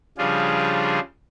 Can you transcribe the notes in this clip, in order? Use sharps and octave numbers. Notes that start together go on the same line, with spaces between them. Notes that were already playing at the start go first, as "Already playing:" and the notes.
C#3 F3 G3 D4 F4 G#4